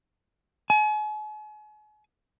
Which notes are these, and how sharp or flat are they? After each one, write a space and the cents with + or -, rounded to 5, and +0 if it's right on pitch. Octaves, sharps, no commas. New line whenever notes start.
G#5 +40